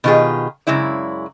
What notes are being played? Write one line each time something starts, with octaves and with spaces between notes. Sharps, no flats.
B2 D#3 F4 G4 G#4
F#2 C#3 G#3 E4 D5